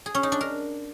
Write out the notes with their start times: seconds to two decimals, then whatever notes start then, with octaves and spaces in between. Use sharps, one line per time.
0.06 G#4
0.15 C#4
0.23 D#4
0.32 D4
0.41 A#4